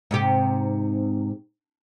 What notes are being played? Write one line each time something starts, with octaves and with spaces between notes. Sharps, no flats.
G#2 C3 G4